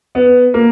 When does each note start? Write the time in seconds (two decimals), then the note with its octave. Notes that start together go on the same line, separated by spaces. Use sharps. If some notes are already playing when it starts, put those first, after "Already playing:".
0.15 B3
0.54 A#3